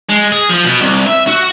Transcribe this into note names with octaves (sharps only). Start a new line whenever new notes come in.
G#3
G#4
F3
B2
C2
E5
F#4